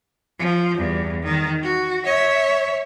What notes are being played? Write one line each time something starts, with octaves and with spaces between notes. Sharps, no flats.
F3
E2 G2
D#3
F#4
C#5 E5